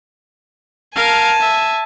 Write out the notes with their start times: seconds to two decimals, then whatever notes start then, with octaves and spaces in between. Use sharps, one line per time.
0.96 A#4 F5 G#5 A5
1.40 E5